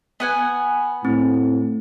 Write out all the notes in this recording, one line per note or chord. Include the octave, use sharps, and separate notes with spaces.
B3 F#5 G#5
A2 C4